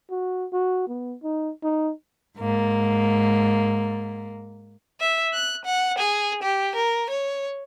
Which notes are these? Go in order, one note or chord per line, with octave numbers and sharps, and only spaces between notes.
F#4
F#4
B3
D#4
D#4
G#2 A#3
E5
F#6
F#5
G#4
G4
A#4
C#5